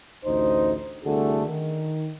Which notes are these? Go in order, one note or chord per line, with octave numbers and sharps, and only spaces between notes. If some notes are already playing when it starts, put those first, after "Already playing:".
A1 D2 D#4 C5
C2 D3 A3 F#4 G#4
D#3